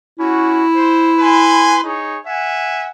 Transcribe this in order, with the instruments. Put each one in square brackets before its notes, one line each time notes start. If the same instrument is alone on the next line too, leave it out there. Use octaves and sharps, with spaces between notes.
[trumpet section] C#4 F#4 [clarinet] E4
[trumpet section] C5
B4 G#5 C6
D#4 G#4 C#5
E5 F#5 G#5